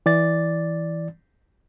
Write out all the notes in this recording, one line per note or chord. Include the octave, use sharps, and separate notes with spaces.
E3 D5 A6